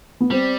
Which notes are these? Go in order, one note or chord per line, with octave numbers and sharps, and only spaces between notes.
B3
G3 C4